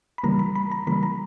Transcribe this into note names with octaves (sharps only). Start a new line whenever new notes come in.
B5
C#3 E3 G3 A#3 A#5
B5
B5
A#5
C#3 E3 G3 A#3 B5
A#5